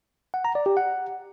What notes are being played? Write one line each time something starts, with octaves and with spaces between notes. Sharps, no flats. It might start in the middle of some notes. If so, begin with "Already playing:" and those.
F#5
A#5
D5
G4
F#5